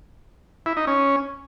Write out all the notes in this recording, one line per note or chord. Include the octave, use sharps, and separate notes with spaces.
E4
D#4
C#4